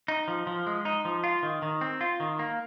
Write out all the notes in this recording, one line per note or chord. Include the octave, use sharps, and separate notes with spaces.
D#4
F3
F3
G#3
D#4
F3
F4
D#3
D#3
C4
F4
D#3
A#3